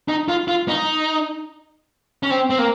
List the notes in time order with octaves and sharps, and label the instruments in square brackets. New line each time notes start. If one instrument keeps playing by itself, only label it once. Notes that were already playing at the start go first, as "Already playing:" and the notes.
[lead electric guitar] D#4
F4
F4
D#4
C#4
C4
C4
A#3